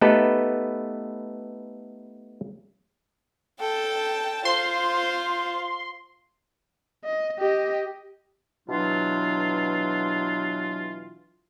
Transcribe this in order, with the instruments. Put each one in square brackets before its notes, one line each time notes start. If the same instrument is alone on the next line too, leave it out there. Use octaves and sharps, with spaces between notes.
[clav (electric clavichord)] A3 B3 D#4 G4 A4 B4
[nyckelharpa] A4 [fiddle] G5 A5
[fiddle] F4 [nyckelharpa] C5 [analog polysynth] C6
[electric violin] D#5
G4 D#5
[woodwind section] B2 E3 F#3 D4 F4